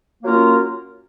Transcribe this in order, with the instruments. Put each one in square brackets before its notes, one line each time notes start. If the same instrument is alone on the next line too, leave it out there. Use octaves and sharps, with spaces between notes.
[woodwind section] F#3 A#3 C#4 F4 A#4